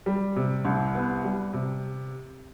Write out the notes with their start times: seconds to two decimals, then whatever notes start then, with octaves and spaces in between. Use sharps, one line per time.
0.06 G3
0.36 C3
0.65 C2
0.95 B3
1.24 G3
1.53 C3